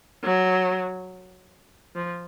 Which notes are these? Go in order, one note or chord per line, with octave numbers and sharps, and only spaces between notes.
F#3
F3